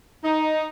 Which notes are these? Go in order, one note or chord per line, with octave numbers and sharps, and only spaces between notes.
D#4